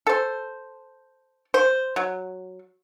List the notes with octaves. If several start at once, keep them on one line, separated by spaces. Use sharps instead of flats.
A4 C5
C5
F#3